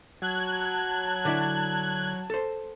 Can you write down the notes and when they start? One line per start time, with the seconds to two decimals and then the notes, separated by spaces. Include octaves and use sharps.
0.22 F#3 A5 F#6 G#6
1.25 D3 D4 E4
2.30 A4 C5